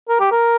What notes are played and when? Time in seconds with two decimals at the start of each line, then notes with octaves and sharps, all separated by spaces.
0.09 A#4
0.20 G4
0.31 A#4